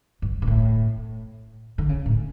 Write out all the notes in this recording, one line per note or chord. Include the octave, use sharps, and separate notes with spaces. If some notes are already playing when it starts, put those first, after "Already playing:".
G2
B2
A2
D3
C#3
A2